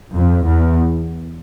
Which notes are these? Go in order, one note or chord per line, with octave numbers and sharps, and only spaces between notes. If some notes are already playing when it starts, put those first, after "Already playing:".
F2
E2